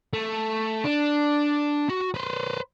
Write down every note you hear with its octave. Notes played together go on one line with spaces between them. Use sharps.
A3
D4
F#4
B4 C5